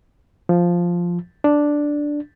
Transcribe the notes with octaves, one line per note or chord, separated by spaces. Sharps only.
F3
D4